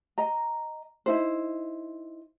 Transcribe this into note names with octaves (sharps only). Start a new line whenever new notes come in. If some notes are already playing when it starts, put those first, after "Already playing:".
D#5 A#5
D#4 E4 C5